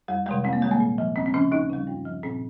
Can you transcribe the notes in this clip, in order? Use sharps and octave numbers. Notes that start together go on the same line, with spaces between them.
F2 G3
C3 D#3 G3 G#3
F2 C4
A#3
D#3 G3 G#3
A#3
A#2
F3
D#2 C4
C4
C#3 F3 C#4
D#2 D#4
C#3 G3
G2
F3
A#2 C4